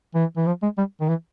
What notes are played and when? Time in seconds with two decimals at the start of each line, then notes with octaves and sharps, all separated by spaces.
0.15 E3
0.37 E3
0.46 F3
0.63 G#3
0.78 G3
1.01 D#3
1.09 E3